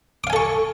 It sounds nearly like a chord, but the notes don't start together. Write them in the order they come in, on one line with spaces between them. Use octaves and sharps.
D6 F5 G#5 A4 C#6